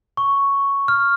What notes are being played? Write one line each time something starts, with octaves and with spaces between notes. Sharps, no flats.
C#6
F6